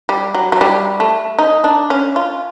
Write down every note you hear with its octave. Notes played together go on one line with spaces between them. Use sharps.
G3
F#3
F#3
G3
A3
D#4
D4
C#4
F4